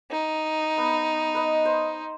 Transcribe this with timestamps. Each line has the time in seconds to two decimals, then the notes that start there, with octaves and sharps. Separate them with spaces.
0.11 D#4
0.78 B3
1.35 B4 D#5
1.65 C5